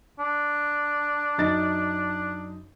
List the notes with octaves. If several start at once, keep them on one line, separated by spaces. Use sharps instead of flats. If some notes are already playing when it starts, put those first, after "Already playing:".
D4
F#2 D#4 A6